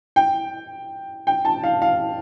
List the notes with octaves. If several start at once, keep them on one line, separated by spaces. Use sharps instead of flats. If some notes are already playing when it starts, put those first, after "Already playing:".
G5
G5
A5
F5
F5